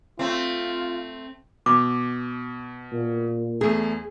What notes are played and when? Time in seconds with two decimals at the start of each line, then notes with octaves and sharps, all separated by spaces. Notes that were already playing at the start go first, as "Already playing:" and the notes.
0.19 A3 C4 F4
1.66 B2 B5 D6
2.92 A#2
3.61 E2 A3 G#4